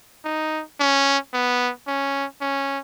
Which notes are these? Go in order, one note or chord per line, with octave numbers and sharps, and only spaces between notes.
D#4
C#4
B3
C#4
C#4